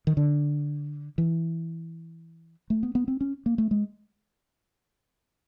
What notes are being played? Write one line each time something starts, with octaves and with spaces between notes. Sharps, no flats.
D#3
D3
E3
A3
B3
B3
C4
C#4
A#3
A3
G#3